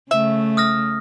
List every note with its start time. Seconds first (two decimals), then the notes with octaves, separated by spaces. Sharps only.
0.11 C#3 A3 E5
0.57 D#6 F6 A#6